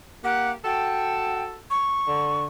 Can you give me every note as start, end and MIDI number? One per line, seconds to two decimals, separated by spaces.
0.24 0.52 58
0.24 0.52 67
0.24 0.51 78
0.65 1.60 66
0.65 1.60 69
0.65 1.44 79
1.70 2.44 85
2.07 2.47 50